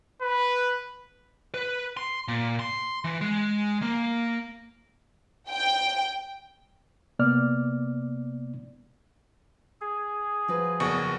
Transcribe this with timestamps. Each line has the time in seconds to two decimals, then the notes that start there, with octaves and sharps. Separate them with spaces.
0.22 B4
1.54 B4
1.97 C6
2.28 A#2
2.59 C6
3.05 E3
3.21 G#3
3.82 A#3
5.51 G5
7.19 C3 A#3 B3 D5 D6 F6
9.81 G#4
10.48 F3 F#4 B4
10.80 F#1 E2 C#6